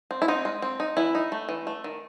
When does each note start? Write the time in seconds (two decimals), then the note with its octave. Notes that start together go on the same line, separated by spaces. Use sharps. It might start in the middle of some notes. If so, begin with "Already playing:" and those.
0.11 C4
0.22 E4
0.28 C4 D#4
0.45 G#3
0.62 C4
0.80 D#4
0.97 E3 E4
1.15 D#4
1.32 A3
1.49 E3
1.67 A3
1.84 D#3